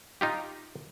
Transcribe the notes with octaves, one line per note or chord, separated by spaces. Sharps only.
D#4 F4 G4